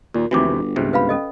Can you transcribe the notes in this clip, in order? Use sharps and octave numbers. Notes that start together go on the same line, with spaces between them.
D#2 A#2
F1 D#2 C3 E3 F#4 D6
G1
C#2 G#2 C3
B4 F5 B5
C#4 A4 D#5